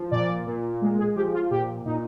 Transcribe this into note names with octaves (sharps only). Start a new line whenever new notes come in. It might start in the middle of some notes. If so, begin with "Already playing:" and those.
Already playing: F3
A#2 D5
A#2
G#3
G#4
F3 G4
F4
A#2 G4
A#2 D#4